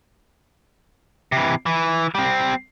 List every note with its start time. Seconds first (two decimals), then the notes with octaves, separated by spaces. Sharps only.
1.32 C3 E3
1.66 E3
2.15 G3 C4